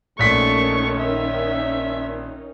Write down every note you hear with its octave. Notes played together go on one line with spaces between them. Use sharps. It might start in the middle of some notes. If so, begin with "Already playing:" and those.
A#1 D#3 A3 C#4 D#4 C#6 B6
E5